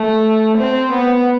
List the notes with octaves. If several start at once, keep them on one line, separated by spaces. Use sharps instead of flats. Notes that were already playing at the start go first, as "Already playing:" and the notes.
Already playing: A3
C4
B3